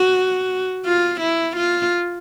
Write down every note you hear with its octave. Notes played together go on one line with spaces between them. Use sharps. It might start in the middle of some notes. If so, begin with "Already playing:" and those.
Already playing: F#4
F4
E4
F4